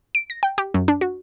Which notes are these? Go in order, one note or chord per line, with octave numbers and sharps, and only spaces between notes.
D7
A#6
G5
G4
F#2
D4
F#4